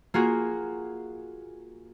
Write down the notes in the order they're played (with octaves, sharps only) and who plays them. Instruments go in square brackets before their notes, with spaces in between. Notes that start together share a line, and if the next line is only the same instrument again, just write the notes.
[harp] A#3 F4 F#4 G#4